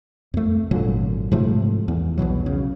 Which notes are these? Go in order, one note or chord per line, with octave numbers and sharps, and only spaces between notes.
F2 A3
G#1 A#2 D3 F#3
G#2 C3 F3 A3
E2
B1 E2 B2 F#3
C#3